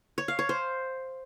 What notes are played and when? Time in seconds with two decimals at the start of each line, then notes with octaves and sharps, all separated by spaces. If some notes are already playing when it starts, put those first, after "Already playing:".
0.18 C#5
0.28 F5
0.39 C#5
0.49 C5